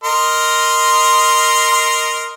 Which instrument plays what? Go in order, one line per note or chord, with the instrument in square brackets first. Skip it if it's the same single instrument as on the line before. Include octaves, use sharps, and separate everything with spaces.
[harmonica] A#4 D#5 C6